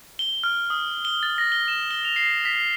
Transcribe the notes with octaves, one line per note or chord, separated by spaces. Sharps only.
G7
F6
D#6
G7
A6
A#6
G7
E7
G7
F7
C7
B6